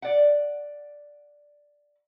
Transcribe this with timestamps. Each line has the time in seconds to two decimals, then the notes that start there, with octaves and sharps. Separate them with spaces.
0.02 D5 F#5